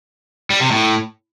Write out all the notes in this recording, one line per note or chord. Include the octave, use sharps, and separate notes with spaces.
G3
C3
A2